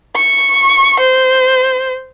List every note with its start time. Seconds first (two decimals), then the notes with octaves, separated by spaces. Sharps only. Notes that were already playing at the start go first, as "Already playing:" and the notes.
0.16 C#6
1.00 C5